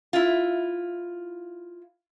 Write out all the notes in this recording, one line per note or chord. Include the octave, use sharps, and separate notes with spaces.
E4 F4